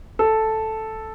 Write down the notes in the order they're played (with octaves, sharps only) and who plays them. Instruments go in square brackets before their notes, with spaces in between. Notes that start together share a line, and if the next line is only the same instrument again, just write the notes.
[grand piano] A4